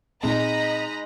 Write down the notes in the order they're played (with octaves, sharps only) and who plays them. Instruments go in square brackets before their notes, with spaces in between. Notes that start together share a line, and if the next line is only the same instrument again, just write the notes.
[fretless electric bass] A#2 C4 [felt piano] G#3 D#4 [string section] D#5 A#5 B5